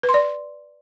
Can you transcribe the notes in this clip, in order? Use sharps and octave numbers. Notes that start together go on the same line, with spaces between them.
B4
C6
D5